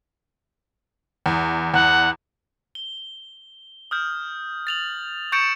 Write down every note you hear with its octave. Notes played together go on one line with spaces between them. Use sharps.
E2
E2 F#5
G7
D#6 F6 G6
A6 F7 F#7
C#6 G6 A6 C#7 D7 E7